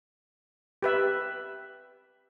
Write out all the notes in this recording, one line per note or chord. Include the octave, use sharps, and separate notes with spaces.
G4 B4 E5